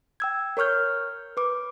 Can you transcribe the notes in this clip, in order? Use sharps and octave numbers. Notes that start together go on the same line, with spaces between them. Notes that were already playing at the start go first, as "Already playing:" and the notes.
G5 E6 G#6
A#4 C#5 C#6 F6 G6
B4 D6